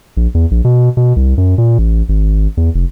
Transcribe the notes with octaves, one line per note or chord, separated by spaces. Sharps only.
A#1
E2
A#1
B2
B2
C2
F#2
A#2
A1
G#1
E2
F1